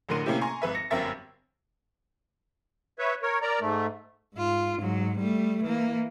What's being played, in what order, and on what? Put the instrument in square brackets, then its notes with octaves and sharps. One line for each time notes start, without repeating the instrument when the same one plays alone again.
[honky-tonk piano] A1 A2 D3 A#4 C6 D#7
A2 C3 A#3 C#4 E4 G4
G#5 A#5 C6 C#6
G#1 B4 E5
A#6 C#7
G1 F#2 C4 A#4 E5 A6
[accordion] B4 C#5 E5
A#4 C#5
A#4 D5 A#5
G#2 A3
[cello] G#2 F4
G#2 F#3
G3 A3
E3 A#3